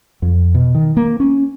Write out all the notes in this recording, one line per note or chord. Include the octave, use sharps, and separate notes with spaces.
F2
B2
D#3
A#3
C#4